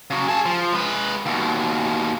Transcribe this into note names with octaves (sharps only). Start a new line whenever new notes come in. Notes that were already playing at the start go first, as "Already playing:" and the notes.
C#3 F#3
G#4 A5
F3
G#3 B4
D#2 B2